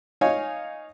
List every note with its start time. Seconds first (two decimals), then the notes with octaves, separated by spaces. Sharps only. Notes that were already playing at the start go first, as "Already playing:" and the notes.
0.21 D#4 C#5 F5 G#5